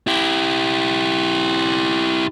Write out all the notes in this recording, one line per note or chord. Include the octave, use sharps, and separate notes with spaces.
E4 G4